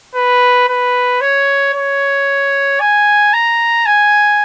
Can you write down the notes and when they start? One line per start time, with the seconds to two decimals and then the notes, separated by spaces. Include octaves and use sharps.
0.15 B4
0.69 B4
1.21 C#5
1.74 C#5
2.80 G#5
3.34 A#5
3.86 G#5